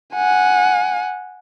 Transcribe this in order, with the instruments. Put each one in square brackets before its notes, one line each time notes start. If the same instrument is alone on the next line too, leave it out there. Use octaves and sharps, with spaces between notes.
[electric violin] F#5 G#5